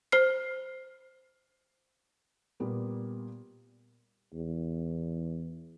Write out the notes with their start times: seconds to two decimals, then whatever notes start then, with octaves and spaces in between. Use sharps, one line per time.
0.12 C5 F6 C7
2.60 A#2 G3 A#3 B3
4.34 E2